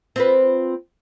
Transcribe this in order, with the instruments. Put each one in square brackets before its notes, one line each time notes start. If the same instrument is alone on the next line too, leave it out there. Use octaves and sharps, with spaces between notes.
[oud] C4 F4 B4